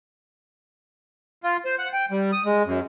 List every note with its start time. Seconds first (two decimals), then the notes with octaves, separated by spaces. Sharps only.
1.43 F4
1.65 C5
1.79 F#5
1.93 G5
2.11 G3
2.32 D#6
2.45 G#3
2.66 F#2